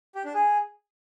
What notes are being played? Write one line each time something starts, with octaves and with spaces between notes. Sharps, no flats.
G4
D4
G#4